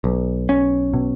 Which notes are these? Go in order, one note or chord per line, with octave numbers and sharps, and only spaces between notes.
B1
C#4
B2